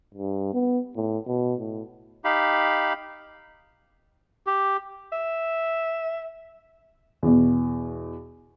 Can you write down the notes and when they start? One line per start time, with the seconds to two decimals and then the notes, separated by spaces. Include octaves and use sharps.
0.14 G2
0.54 B3
0.96 A2
1.27 B2
1.60 A2
2.24 D#4 G4 F5 B5
4.47 G4
5.12 E5
7.23 E2 B2